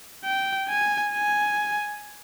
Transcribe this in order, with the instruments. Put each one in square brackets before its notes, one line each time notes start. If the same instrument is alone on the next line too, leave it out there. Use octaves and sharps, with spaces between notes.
[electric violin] G5
G#5
G#5